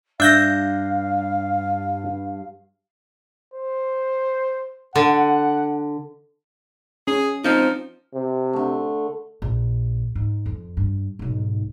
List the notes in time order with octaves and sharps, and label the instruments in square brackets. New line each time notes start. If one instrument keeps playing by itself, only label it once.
[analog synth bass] G2 [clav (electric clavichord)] D4 [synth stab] E5 G6 A#6 [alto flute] F5
[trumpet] C5
[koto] D3 [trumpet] F#5
[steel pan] C#4 [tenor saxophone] G#4
[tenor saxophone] F3 [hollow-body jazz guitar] C4 D#4
[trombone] C3
[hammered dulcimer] D3 A3
[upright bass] A#1
G#2
F2
G2
B1 G#2